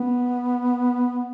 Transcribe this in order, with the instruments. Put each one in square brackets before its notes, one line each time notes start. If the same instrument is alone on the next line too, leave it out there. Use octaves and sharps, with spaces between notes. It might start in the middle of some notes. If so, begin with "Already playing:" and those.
Already playing: [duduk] B3